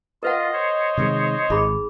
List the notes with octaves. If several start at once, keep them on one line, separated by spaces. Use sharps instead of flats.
F4 A#4 B4 D#5 F#5
C5 C#5
C3 D#3 G#3
G#1 D#4 G#4 B5